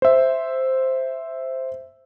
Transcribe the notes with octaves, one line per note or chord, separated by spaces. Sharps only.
C5 E5